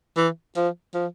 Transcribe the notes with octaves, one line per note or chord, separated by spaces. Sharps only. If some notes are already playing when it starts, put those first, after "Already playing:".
E3
F3
F3